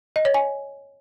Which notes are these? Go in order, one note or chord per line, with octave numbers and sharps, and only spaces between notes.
D#5
C#5
G#5